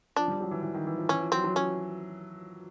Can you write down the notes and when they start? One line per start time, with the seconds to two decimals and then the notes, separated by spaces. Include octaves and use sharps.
0.16 F3 D4
0.28 G3
0.41 F#3
0.51 E3
0.63 E3
0.74 D#3
0.87 E3
0.98 F3
1.09 E3 C#4
1.20 F3
1.32 F#3 C4
1.44 F#3
1.55 F3 C#4